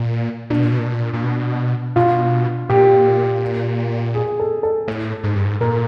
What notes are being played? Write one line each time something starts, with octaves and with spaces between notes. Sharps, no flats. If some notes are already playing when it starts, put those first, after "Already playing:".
Already playing: A#2
A#2 D4
B2
A#2
B2
A#2
B2
A#2
A#2
B2
B2 F4
A#2 G4
G#4
A4
A4
A2
G#2
G2
G#2
A#2 A#4